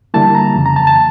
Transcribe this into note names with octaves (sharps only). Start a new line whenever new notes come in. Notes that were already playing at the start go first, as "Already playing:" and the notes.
D3 G3 A#3 E4 A5
A#5
F2 C#3 E3
A#5
A5
A5